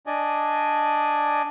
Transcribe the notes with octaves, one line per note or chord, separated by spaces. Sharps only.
D4 D5 D#5 G#5